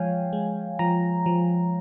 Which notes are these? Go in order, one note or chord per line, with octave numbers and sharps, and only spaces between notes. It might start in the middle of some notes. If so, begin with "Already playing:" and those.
Already playing: F3 G#3 C#5 F5 G5 G#5
G#3
F3 A#5
F3